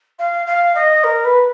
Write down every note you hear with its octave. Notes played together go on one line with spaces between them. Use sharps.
F5
F5
D#5
A#4
B4